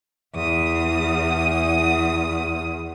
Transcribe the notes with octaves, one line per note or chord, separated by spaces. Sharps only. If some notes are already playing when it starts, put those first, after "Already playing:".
E2 D#6